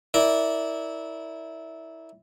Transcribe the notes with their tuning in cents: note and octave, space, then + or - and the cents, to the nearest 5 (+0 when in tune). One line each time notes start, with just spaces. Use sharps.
E4 -15 A#4 +0 D5 -15